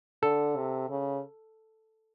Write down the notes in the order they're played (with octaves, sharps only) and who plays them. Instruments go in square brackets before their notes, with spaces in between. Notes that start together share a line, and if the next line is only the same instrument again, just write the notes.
[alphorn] D3 [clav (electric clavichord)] A4
[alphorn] C3
C#3